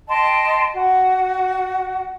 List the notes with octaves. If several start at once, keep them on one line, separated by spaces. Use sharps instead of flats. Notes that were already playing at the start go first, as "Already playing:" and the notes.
D#5 G5 A5 C6
F#4